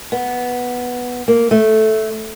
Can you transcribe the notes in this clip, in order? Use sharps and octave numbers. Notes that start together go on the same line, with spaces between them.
B3
A#3
A3